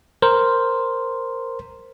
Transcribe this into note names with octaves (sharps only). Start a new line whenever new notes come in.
A#4 C5